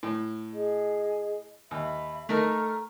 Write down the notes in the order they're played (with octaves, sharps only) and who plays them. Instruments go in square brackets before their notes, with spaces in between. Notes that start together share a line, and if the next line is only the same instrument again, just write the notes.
[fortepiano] A2
[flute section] G#4 D#5
[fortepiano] D#2 [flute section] E5 B5
[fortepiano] A3 D#4 A#4 [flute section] A4 A#5 F6